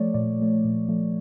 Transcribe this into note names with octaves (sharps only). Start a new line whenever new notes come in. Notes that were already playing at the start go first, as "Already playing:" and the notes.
Already playing: F3 A3 C#5 D5
A#2 D5
F3 A3
A#2
F3 A3